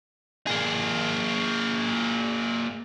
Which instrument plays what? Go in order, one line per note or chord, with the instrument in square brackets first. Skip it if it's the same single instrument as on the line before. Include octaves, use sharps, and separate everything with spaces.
[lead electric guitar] A#3 G#4